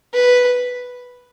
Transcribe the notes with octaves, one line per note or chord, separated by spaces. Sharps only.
B4